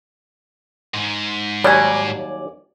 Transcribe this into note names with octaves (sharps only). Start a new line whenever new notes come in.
G#2
D#2 F#3 G3 D5 G#5